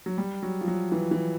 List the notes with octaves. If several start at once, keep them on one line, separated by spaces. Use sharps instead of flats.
F#3
G3
F#3
F3
F#3
E3
E3